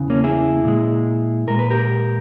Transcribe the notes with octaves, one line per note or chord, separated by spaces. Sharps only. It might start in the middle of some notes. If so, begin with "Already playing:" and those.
Already playing: E2 C#3 E3
A#3 C#4
E4 G#4
A#2 G#3
A#2 G#3 A#4
B4
G4 A#4